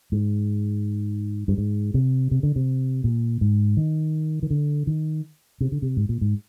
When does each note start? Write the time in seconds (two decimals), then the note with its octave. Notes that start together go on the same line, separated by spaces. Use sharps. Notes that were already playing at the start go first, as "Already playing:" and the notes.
0.12 G#2
1.48 G2
1.58 G#2
1.94 C3
2.31 C3
2.43 D3
2.56 C3
3.04 A#2
3.41 G#2
3.77 D#3
4.43 D#3
4.51 D3
4.87 D#3
5.61 C3
5.72 D3
5.82 C3
5.97 G#2
6.09 A#2
6.21 G#2